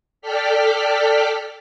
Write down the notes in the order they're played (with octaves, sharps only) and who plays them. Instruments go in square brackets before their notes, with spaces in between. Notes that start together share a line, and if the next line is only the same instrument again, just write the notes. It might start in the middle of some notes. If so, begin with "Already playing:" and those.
[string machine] A4 D5 G5 F6 B6